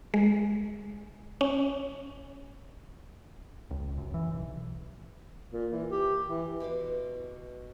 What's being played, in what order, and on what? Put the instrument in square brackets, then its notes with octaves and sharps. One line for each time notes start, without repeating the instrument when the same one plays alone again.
[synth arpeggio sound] G#3
C#4
[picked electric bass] C#2
F#2
E3
B1
[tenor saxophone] A#2
E3
G4
E3
[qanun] B2 B4 C5 D6